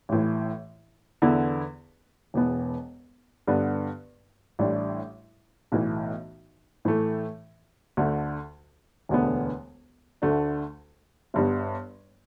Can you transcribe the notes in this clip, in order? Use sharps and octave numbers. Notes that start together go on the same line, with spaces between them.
A1 A2 E3
E2 D3 B3 E4
E1 E2 B2 B3
G2 D3 B3 D4
A1 A2 G3 D4
B1 A2 E3
A2 E3 A3
D2 D3 A3
E1 D2 D3 B3
D2 D3 A3 D4
G1 G2 G3 B3